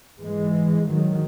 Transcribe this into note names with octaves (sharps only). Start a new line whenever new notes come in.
G#2 E3 G#3
D#3 F#3